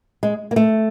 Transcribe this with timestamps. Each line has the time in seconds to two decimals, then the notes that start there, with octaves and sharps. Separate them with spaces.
0.23 G#3
0.51 A#3
0.56 A3